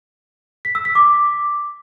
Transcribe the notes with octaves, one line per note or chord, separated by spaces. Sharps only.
B6
E6
B6
D6